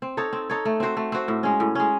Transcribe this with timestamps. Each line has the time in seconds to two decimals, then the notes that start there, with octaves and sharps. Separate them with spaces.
0.02 C4
0.17 D#4 A4 C#5
0.33 C4
0.50 D#4 A4 C#5
0.65 A3
0.80 C4 F#4 C5
0.97 A3
1.12 C4 F#4 C5
1.28 A2
1.43 G#3 C#4
1.60 A2
1.75 G#3 C#4